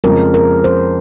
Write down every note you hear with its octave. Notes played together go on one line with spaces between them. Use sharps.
F2 C#3 G#3 A#4
A#4
C5